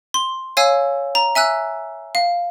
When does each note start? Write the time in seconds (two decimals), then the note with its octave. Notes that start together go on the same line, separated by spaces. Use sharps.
0.14 C6
0.57 C#5 F5 G#5 E6
1.15 A#5
1.35 E5 G#5 E6 F#6
2.15 F5